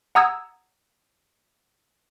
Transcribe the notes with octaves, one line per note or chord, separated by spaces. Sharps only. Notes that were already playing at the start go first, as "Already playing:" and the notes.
F#5 A#5 D#6 E6 G#6